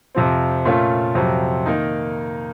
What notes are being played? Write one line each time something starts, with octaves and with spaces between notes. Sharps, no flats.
F2 C3 F3 C4
A#2 A3 C#4 F4
F2 C3 F#3 C4
D#3 A#3 D#4